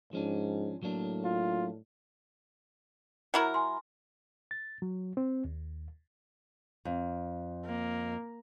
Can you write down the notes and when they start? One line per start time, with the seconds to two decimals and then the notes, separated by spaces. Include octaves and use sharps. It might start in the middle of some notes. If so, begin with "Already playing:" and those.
0.13 G#2 F3 C#4 D4
0.83 A2 F#3 A#3 D4
1.24 F4
3.34 F#3 E4 A#4
3.54 G#5 C6
4.51 A6
4.82 F#3
5.17 C4
5.45 D#2
6.85 F2
7.65 A#3